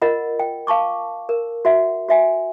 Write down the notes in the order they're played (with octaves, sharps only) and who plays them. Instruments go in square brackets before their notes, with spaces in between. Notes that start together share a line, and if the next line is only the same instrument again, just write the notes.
[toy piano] F4 A#4 D#5 F#5
G5
F5 A5 C#6 D6
A#4
F#4 E5 F#5
F#4 E5 G#5